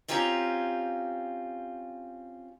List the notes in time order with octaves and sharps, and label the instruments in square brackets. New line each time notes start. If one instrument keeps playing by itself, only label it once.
[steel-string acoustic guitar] C4 C#4 F4 G4 G#5 A#5